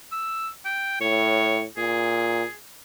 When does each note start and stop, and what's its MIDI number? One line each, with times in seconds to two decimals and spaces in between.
0.12 0.49 88
0.66 0.99 79
1.01 1.65 45
1.01 1.64 73
1.77 2.43 46
1.77 2.55 68